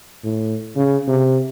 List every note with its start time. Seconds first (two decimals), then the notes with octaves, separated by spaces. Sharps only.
0.24 A2
0.76 C#3
1.08 C3